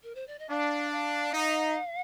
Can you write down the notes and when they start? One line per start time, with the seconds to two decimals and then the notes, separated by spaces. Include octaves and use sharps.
0.03 A#4
0.15 C5
0.27 D5
0.39 D#5
0.49 D4 F5
0.92 F5
1.33 D#4